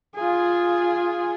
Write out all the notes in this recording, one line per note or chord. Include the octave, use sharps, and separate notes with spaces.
F4 G#4